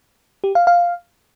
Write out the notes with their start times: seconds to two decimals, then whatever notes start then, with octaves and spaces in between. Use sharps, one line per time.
0.44 G4
0.55 F5
0.67 F5